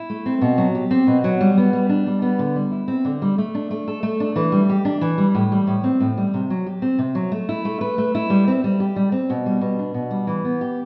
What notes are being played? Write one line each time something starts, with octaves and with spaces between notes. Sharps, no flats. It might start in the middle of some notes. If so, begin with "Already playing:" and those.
Already playing: E4
A3
C4
B2
F#3
G4
C4
B2
F#3
G3
B3
G3
D4
G3
B3
D3
G3
E4
C4
D3
G3
A3
D4
A3
A4
A3
D4
E3
G3
G4
D4
E3
G3
A2
G3
A2
C4
A2
G3
C3
F#3
G4
C4
C3
F#3
A3
E4
A3
B4
A3
E4
G3
C4
G3
G4
G3
C4
B2
G3
B2
D4
B2
G3
E3
B3
G4